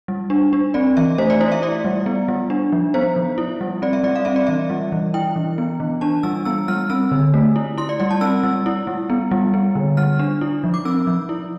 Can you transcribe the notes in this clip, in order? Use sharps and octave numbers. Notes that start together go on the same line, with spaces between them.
G3
D4
D4
C4 D5
E3 E5
A3 C5
D5
E4 C5
E5
E4 D5
G3
B3
G3
D4
F3
B3 C5
F3
E4
G3
C4 D5
E5
G3 D5
F5
C4 E5
D5
E3 E5
G3
E3
E4 G5
E3
B3
E3
D4 A5
G3 E6
B3 E6
G3 F6
C4 E6
D3
A3
E4
E4 C6
D5
G3 D5
A5
C4 E6
G3
E4
G3
B3
G3
B3
D3
G3 F6
D4
E4
F3
D6
C4 E6
F3
E4